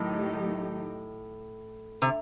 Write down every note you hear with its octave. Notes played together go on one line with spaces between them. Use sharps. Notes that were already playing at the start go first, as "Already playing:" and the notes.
Already playing: A2 D#3 F#3 A3 D#4 G4
C3